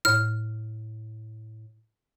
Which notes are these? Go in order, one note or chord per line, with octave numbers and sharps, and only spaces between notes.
A2 F6